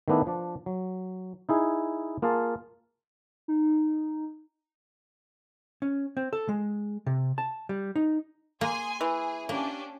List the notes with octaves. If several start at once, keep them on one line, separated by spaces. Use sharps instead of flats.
D#3 A3 B3 D4 E4
F3 D4
F#3
D#4 E4 G#4
A#3 F4 G#4 F5 A5
D#4
C#4
C4
A4
G#3
C3
A5
G3
D#4
A#3 G#4 G#5 C6
E3 G#4
A#3 C#4 D4 G4